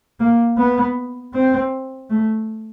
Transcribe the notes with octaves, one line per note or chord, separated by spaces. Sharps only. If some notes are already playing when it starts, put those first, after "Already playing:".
A#3
B3
C4
A3